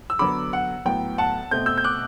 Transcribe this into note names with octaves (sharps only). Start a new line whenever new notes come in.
E6
D3 F#3 B3 B5 D6
F#5
A2 F#3 B3 G5
F#5 A5
B2 A3 C4 G6
E6 G6
G6
D6 F#6